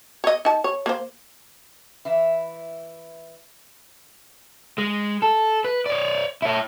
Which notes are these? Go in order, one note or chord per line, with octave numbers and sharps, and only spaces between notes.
C#5 D#5
D#4 A5
C#5
A#3 C5
E3 E4
G#3
A4
B4
C#5 D5
E4 C#5